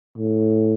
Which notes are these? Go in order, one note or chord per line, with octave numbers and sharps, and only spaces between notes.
A2